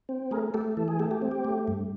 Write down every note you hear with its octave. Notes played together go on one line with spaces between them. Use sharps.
C4
A3 G#4 A#4
A3 G4 A4
E3 A4
G#4
A3 G4 A4
G4
C4
G4
A3
G2